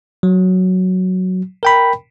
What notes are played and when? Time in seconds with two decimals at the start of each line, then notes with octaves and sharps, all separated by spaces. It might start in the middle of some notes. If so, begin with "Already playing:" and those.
0.23 F#3
1.63 A#4 G5 B5